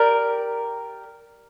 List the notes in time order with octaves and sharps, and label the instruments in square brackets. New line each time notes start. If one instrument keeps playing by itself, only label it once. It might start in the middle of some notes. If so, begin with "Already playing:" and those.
Already playing: [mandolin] G4 A#4 D5